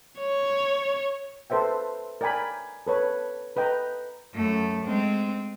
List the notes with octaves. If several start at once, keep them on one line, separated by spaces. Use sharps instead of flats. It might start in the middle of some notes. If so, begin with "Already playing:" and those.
C#5
A4 B4 C5 E5 G5
A#4 D5 G5 G#5 B5
A4 B4 C#5
A4 B4 D#5 G5 A#5
F#2 A3
G#3 C4